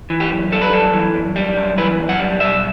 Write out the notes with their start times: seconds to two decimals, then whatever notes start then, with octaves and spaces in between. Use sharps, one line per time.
0.10 E3
0.20 G4
0.31 F#2
0.52 G3 A4
0.62 B4
0.73 F#2 A4
0.94 E3
1.15 F#2
1.36 G3
1.57 F#2
1.78 E3 B4
1.99 F#2
2.09 F#5
2.19 G3
2.40 B1 E5